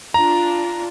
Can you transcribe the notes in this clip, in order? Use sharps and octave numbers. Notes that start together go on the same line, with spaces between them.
D4 F4 A#5